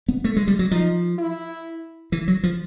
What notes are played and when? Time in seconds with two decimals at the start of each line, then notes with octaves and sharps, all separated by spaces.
0.08 B3
0.24 A3
0.36 G#3
0.48 G3
0.59 F#3
0.71 F3 D#4
1.19 E4
2.12 E3
2.28 F#3
2.43 F3